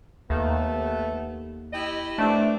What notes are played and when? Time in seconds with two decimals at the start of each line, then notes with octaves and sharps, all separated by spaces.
0.30 D#2 A3 B3
1.73 E4 G4 D#5
2.18 G2 A3 C4 D4